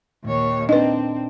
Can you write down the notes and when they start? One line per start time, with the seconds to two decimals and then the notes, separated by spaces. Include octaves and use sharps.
0.25 D#2 A#2 C#5
0.69 C4 D4 D#4 B4 D#5